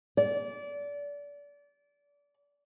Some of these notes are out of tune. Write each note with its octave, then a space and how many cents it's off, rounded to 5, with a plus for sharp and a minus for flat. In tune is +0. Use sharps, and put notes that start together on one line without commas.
D5 -25